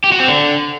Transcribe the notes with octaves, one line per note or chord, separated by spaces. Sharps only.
G4
F#4
C4
D3